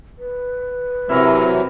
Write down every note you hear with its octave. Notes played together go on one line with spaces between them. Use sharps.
B4
C3 E3 F#3 E4 A#4